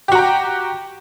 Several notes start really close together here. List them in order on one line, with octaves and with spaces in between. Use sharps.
G4 F#4 A#5 G5